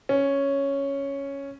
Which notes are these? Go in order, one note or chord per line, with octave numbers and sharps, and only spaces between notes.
C#4